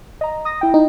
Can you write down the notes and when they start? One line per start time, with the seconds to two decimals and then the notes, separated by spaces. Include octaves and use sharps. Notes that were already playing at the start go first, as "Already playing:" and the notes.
0.21 D#5 A#5
0.45 D#6 A#6
0.61 E4 G5
0.74 D#4